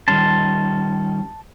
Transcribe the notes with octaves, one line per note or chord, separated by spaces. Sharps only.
D#3 G3 C#4 A5 C6